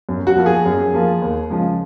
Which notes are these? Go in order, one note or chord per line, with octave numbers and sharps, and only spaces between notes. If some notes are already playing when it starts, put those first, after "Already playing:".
F#2
F#4
F3 A#3 F4
G#4
F#2
F3 A#3 F4
D#2
C#3 F3 G#3